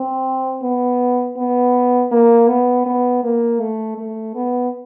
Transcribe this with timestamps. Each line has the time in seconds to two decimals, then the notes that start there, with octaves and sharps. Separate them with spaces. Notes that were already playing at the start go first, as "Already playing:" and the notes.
Already playing: C4
0.63 B3
1.37 B3
2.11 A#3
2.48 B3
2.86 B3
3.23 A#3
3.60 A3
3.98 A3
4.35 B3